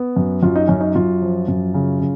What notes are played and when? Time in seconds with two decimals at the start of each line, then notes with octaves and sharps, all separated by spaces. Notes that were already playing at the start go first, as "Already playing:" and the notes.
Already playing: B3
0.16 F#2
0.43 F#2 F4
0.56 D#4
0.67 F#2 C#4
0.80 D#4
0.95 F#2 F4
1.22 F3
1.48 F#2
1.74 C#3
2.01 C#3